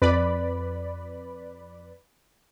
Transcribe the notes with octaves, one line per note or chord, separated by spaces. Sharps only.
F2 B4 D5 B5